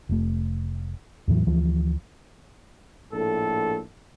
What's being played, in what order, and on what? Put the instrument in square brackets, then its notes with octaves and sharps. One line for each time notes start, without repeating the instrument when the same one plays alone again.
[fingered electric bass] F1 A3
E2 A2 E3 F#3
D2 E3 F3
[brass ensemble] A#1 A2 A4